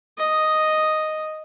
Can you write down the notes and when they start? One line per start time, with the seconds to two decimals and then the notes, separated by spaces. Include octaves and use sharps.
0.17 D#5